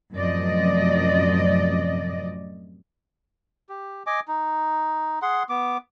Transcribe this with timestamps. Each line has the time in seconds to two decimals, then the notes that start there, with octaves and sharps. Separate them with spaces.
0.13 F#2 A2 C3 F3 D5 D#5
3.69 G4
4.07 D#5 G#5 D6
4.28 D#4
5.22 G#4 F#5 C6
5.49 B3 D6